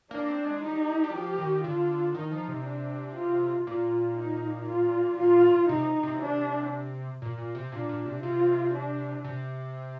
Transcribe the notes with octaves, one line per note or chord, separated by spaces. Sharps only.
A#3 D4
C4
G#3
G3 D#4
G3
F3 G4
D#3
D3 F4
D#3 D#4
F3
C3
D4
F4
A#2 F4
D#4
F4
F4
C3 D#4
C3
D4
A#2
A#2
C3
A#2 D4
A#2
C3
C3 F4
D4
C3